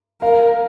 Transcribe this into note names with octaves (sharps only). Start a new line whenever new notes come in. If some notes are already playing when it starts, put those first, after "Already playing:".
A#4 F5